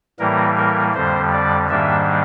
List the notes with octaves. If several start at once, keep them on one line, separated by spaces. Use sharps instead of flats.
A2 E3 G3 A#3 A#4
A#4
F2 D3 G3 C5
D5
G#2 D#3 G3 A#3 D4 E5